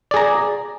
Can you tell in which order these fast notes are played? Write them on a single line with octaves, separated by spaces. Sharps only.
D5 G#4 A#5